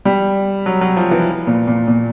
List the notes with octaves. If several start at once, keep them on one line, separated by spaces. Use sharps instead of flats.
G3
F#3
F#3
F3
E3
A#2
A#2
A#2